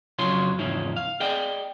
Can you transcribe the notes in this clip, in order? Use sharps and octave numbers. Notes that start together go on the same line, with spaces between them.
F2 C#3 F#3 F4 C#5 C6
E2 G#2 C#3 F3 C#4 E4
F5
G#4 D5 D#5 G5